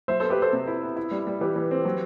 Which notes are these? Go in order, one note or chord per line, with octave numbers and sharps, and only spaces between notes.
F#3 C5 E5
B3 A4 C5
G4 B4
B3 A4 C5
C3
E4
B3
E4
G3
G3
E3 G4 B4
E3
C4
F#3